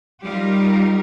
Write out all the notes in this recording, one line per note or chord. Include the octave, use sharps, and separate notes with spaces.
G3 D#4 F4 G4 A#4